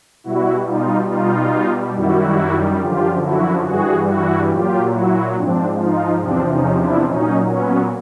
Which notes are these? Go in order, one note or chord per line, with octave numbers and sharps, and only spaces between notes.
B2 G3 E4 F#4
D#4 F4
B2 G3 D#4 F4
F#2 D#3 G3 E4 F#4
F#2 D3 F3 F4 G4
E4 F#4
G2 E3 G3 F#4 G#4
E4 F#4
A#2 F#3 F4 G4
E4 F#4
G#2 F3 C4 D4
D#4 F4
E2 C3 F3 C4 D4
C#4 D#4
D4 E4
A#2 F#3 C#4 D#4
B3 C#4